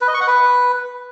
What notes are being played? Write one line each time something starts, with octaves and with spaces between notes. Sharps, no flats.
B4
D#5
C#6
F#5
B4